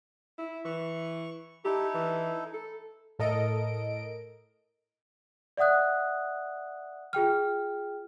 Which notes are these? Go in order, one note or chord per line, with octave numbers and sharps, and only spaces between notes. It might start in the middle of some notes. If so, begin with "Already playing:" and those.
E4
E3 C#6
D#4 E4 G4 A4
E3
A4
A2 A4 A#4 D#5 D7
D5 E5 F#5 D#6 F#6
F4 G#4 G5 F6